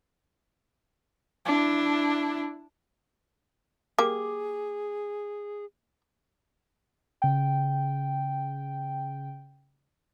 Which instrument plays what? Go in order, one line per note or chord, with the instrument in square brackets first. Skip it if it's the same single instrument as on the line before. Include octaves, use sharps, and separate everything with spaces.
[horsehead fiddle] D4 E4
[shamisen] A#3 G4 [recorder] G#4 [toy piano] D6
[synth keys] C#3 G5